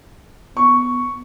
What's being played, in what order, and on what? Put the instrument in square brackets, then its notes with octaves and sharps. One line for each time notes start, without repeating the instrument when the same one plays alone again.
[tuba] B3 [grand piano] C#6